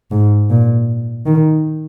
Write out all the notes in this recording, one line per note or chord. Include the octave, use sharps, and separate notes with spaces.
G#2
A#2
D#3